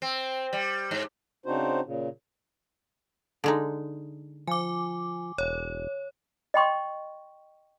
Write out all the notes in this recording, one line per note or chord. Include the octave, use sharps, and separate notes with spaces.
C4
G3
G#2
C#3 C4 D4 D#4 F#4 C5
A#2 C#3
D3 G#3 D#4
F3 G#5 D6
E1 C#5
D#5 G5 C6 C#6